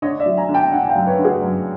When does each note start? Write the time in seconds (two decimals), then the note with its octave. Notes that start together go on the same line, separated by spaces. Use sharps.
0.02 D3 C#5 D#5
0.20 D5 E5
0.26 F#3
0.37 G#5 A#5
0.49 D3
0.54 G5 A5
0.72 D3 F#5 G#5
0.85 G#5
0.89 F5 G5
0.95 F#2
1.07 B4 C#5
1.18 D3
1.24 F#4 G#4
1.42 F#2